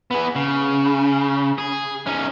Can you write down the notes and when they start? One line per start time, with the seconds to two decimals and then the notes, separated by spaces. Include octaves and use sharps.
0.11 B3 G#4
0.36 C#3
1.58 G#4
2.07 C#4 D#4